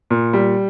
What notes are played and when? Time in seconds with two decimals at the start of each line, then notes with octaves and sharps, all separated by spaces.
0.10 A#2
0.33 G3